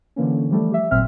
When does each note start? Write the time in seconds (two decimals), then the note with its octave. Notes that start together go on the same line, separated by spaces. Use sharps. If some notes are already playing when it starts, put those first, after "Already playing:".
0.16 D3 E3 A#3 C#4
0.49 E3 F3 G3 A3
0.71 G4 E5
0.91 G#1 A#2 F#3 C4 E5 F6